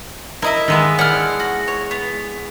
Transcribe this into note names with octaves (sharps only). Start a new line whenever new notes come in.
E4 A#4 D#5 E5
D#3 G#3 B3
D4 E4 F#5 F6
F#4
C#5
B3